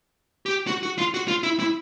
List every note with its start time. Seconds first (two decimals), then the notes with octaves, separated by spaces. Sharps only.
0.46 G4
0.67 F#4
0.83 F#4
0.98 F4
1.14 F#4
1.28 F4
1.43 E4
1.60 E4